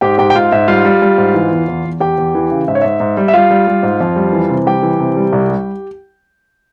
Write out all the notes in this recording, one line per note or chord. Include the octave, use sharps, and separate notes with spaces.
G#2 G4 G5
G#2 G4 G5
G5
G#2 F4 F5
G#2 E5
G3 F4 F5
G3
G3
G#2
E3
E2
E2
E2
E2 G4 G5
E2
E3
C#3
G#2 E5
C#5
G#2 E5
G#2
G3
E5
G3 F4 F5
G3
G3
G#2
F2
G3
E3
C3
G3 G4 G5
E3
C3
G3
C2
G3